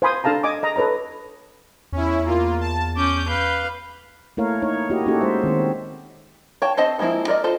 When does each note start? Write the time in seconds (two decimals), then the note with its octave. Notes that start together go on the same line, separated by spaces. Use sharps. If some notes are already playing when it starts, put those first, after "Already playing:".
0.02 C5 F5 G#5 B5 C6 D#6
0.24 D4 A4 F5 A5 A#5
0.43 D#5 G#5 D6 D#6
0.63 D#5 A#5
0.76 A4 B4 C#5 A#5
1.92 E2 C#4 E4
2.25 A#3 F4
2.61 A5
2.97 C#4 D6 G6
3.28 B4 F5
4.37 A3 A#3 E4 A#4 C#5 F5
4.62 D#4 C#5
4.90 A#3 E4 F#4 G4 D#5
5.06 A#3 C#4 D#4 F#4 G4 A4
5.21 G#3 C5 E5
5.44 D#3 C4
6.62 C#5 G5 A5
6.77 C4 A4 C5 D#5 A5
6.99 F3 G#3 A#3 C4 E4
7.28 A#4 D5 D#5
7.44 F4 A4 C5